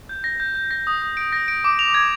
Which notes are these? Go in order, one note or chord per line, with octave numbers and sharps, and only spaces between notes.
G6
A#6
G6
G6
A#6
D#6
D#6
D7
A#6
D7
D6
F7
G#6